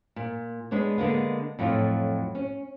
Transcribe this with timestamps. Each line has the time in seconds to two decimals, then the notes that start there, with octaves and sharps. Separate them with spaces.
0.16 A#2
0.71 G#3 B3 D4 C#5
0.98 D3 G#3 A#3 B3
1.59 F2 A2 F#3 F4
2.35 C#4